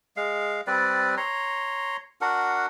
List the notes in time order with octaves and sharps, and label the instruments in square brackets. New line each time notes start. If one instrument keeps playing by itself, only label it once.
[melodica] G#3 F5
G3 C4 B4 D5
C#5 A#5 C6
D4 F#4 A#4 F#5